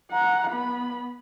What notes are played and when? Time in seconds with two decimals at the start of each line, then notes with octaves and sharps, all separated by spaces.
0.11 F#5 A#5
0.51 B3 B5